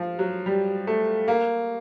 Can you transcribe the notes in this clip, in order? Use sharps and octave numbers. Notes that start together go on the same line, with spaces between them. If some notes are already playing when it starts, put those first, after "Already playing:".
Already playing: F3
F#3
G3
A3
A#3